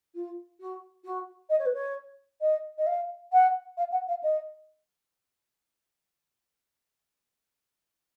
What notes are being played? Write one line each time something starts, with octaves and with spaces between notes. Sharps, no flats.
F4
F#4
F#4
D#5
C#5
B4
C#5
D#5
D#5
F5
F#5
F5
F#5
F5
D#5